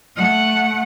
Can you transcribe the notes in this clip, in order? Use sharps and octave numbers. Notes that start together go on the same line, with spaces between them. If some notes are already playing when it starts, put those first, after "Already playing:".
A3 F#5